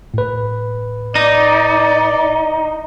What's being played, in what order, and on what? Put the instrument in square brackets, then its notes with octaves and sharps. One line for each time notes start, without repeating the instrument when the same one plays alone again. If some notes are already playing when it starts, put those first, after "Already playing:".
[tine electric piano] A2 B4
[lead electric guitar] D#4 [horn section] D5